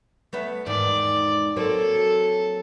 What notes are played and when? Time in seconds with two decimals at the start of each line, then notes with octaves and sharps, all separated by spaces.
0.33 A3 B3 E5
0.66 E2 G#2 D#3 D5
1.56 F#3 A#3 C4 A4